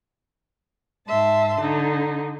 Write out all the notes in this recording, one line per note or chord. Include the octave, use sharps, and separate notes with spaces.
G#2 E5 A5 C6
D3 D#4